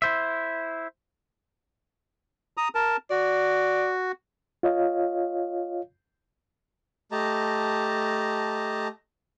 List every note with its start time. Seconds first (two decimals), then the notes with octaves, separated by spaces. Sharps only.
0.02 E4 C5 E5
2.57 A#5 D#6
2.75 A#4 A5
3.10 F#4 D5
4.63 F4 C#5 D#5 F5
7.12 A3 G4 D#5 A5 A#5